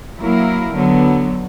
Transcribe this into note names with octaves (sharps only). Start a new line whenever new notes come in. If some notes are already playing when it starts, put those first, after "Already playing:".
F#3 A#3 E4 A#4
D3 F#3 B3